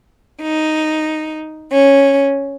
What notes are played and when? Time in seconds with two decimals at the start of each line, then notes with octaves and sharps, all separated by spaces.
0.42 D#4
1.72 C#4